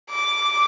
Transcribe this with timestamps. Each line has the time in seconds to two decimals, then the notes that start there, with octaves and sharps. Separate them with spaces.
0.10 D6